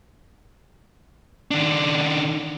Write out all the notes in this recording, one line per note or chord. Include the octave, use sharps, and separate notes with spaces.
D#3 D4